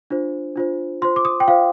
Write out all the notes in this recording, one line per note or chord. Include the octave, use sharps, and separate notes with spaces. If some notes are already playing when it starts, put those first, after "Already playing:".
D4 F4 C5
D4 F4 C5
F4 C5 C6
D6
D#6
G5
F4 C5 F5